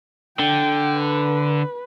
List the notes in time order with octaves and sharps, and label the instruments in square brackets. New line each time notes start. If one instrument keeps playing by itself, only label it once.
[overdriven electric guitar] D3 [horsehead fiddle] G5
[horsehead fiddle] B4